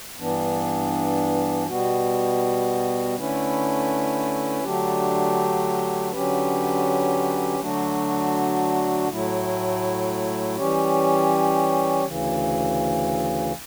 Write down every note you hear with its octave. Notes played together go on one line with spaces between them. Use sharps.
G2 E3 B3 D4
B2 G3 B3 F#4
D3 A3 C#4 E4 B4
D3 F#3 A3 D4 G4
D3 F#3 C#4 G4 B4
D3 F#3 A3 D4 F#4
A2 F#3 A3 E4
E3 G3 C#4 G4 C#5
D2 C#3 E3